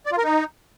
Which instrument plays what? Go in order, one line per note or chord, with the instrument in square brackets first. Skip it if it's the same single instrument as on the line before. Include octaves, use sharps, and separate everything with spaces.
[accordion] D5
F4
A#4
D#4